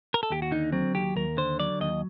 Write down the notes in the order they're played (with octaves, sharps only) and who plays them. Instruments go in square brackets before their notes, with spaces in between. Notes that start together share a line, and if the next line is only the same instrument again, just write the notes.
[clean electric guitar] A#4
A4
D#2 G4
F#4
D3 D#4
F#3 C4
D#2 G4
D#2 A#4
D3 C5
F#3 D5
D#2 D#5